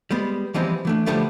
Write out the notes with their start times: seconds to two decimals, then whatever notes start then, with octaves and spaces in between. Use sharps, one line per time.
0.11 G3 G#3 B3
0.54 E3 F3 G3 G#3 B3 C4
0.85 E3 A3 D4
1.06 D3 F3 G3 A3 B3 D4